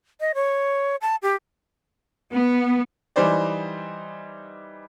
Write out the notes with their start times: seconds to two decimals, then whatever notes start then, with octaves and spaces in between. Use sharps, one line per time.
0.20 D#5
0.35 C#5
1.01 A5
1.22 G4
2.35 B3
3.16 E3 G3 D#4 C5 D5